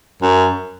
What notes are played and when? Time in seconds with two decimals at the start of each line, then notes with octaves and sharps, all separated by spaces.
0.22 F#2